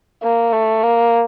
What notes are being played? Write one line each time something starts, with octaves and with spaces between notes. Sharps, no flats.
A#3
A3
A#3